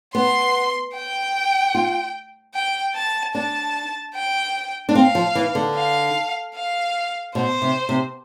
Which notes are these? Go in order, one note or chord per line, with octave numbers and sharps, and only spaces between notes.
B3 C6
G5
F4
G5
A5
D4 A5
G5
D4
C4 F5
F3
E3
D3
F5
F5
B2 C5
C3
C3